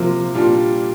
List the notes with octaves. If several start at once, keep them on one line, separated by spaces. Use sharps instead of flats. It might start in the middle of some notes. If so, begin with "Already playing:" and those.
Already playing: C3 F3 A#3 F4
A#2 G3 D4 F4